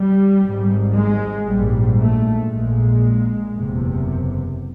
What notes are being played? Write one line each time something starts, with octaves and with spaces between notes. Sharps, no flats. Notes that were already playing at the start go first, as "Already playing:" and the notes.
Already playing: G3
G#1 G#2
G#3
A#1 G#2 G3
A3
A#1 A#2 G#3
F#1 E2 C3